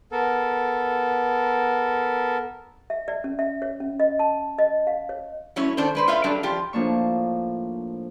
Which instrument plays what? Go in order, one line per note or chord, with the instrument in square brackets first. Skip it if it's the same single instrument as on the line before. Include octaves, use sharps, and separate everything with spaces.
[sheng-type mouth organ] B3 A4 A#4
[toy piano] E5
D5
C#4
E5
C#5
C#4
D#5
A5
D#5
F5
C#5
[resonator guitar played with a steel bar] F#3 A3 C#4 E4 C#5
D#3 D4 A4 C5
G#3 B4 C5
F4 B4 C#5 E5 F5
F#3 G3 D4 A4 F5
F3 F4 G4
[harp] A2 F3 A#3 D4 C#6